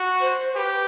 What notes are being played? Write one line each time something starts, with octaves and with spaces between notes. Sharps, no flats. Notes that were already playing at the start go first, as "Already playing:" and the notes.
Already playing: F#4
C5
G4 B4